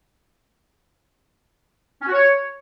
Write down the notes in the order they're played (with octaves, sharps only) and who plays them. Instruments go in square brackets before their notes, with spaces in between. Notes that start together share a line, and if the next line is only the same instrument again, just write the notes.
[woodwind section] C#4
F#4
C#5